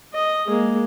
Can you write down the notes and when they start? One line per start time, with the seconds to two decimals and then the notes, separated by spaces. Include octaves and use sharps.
0.14 D#5
0.46 G#3 A#3